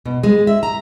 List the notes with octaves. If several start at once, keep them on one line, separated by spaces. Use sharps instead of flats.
B2
G#3
E5
A#5